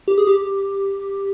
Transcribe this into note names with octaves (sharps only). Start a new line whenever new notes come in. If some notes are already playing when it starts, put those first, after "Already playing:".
G4
G#4
G4